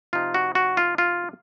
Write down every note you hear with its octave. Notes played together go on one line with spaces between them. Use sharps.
C3 F3 C4 D#4 F4
F#4
F#4
F4
F4